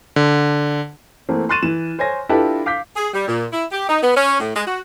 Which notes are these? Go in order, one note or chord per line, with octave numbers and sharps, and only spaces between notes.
D3
E3 A3 A#3 C4
C6 C#6 F#6 A6 D#7 E7
E3 E7
C5 C#5 G#5 C6 A#6
D4 E4 F4 G4 A4 B4
F5 D6 G6 B6
G#4
G3
A#2
E4
G4
D#4
B3
C#4
A2
G#3
F#4